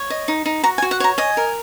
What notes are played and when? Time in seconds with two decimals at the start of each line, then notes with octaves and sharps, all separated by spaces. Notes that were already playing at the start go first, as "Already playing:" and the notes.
Already playing: C#5
0.10 D#5
0.28 D#4
0.46 D#4
0.63 F#4 A#5
0.78 G#5
0.82 F#4
0.91 F#5
1.00 C#5 A#5
1.18 D#5 G#5
1.37 A#4